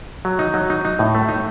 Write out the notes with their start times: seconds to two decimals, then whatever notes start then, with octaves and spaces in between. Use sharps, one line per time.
0.25 F#3
0.39 D#4
0.54 F#3
0.70 D#4
0.85 D#4
0.99 A2
1.14 A3
1.29 D#4